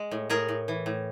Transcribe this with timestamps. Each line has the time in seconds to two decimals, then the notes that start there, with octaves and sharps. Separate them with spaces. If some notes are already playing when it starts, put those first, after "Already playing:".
Already playing: G#3
0.11 A2
0.30 A2 G#4 A#4
0.49 A2
0.68 E3
0.86 A2